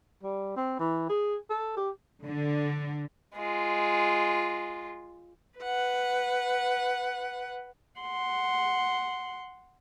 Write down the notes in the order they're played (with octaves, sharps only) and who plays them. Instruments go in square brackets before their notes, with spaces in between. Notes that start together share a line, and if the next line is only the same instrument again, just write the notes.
[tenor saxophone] G3
C4
E3
G#4
A4
G4
[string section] D3
[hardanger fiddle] G#3 F4
[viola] B4 F#5
F#5 C6